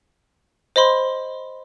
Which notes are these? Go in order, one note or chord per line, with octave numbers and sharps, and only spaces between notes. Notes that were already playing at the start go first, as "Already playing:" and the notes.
C5 D#5 B5 C6